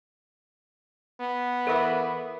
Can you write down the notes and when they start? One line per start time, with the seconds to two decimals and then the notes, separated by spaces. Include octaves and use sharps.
1.20 B3
1.67 E3 A4 A#4 E5